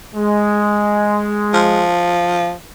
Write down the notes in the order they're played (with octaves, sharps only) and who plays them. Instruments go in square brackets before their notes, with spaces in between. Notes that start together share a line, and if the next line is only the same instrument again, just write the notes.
[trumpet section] G#3
[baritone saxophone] F3